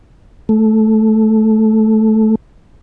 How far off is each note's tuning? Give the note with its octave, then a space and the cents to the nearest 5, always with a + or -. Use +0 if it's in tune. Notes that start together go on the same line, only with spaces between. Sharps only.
A3 -10